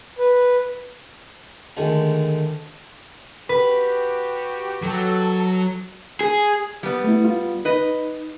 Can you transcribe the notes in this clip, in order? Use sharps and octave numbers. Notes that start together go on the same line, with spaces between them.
B4
D2 D#3 G#3 A3
F#4 G4 B4
F#3 A4
G#4
G3 B3
A3 E4
F4
D#4 B4 D#5